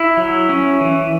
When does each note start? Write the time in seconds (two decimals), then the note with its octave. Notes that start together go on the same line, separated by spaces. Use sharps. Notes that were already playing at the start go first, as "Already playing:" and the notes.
Already playing: E4
0.17 F#3
0.49 C#4
0.81 E3